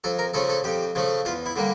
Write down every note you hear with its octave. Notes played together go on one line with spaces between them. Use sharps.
F2 A4
A#4
C#3 F3 A3 A4
A4
F2 G4
C#3 F3 A3
E2 F4
E4
D3 G3 A#3